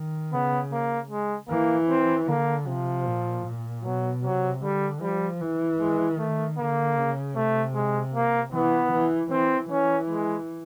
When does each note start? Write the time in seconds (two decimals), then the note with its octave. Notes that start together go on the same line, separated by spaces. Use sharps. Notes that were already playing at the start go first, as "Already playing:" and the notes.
Already playing: D#3
0.33 C#3 B3
0.72 A#3
1.10 G#3
1.49 E3 A#3
1.89 C4
2.28 D3 A#3
2.66 C3 F3
3.05 A#2
3.45 A#2
3.84 B2 F#3
4.24 C3 F#3
4.62 D3 G3
5.01 F3 G3
5.40 E3
5.80 G#3
6.18 D#3 A3
6.57 D3 A#3
6.97 C#3
7.35 C3 A3
7.74 G#3
8.14 A#3
8.53 E3 B3
8.92 E3
9.31 E3 C4
9.70 E3 C#4
10.09 G#3